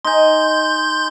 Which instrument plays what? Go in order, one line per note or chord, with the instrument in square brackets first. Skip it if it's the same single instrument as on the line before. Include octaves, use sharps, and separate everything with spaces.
[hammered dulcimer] D#4 G#5 [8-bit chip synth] C6 G6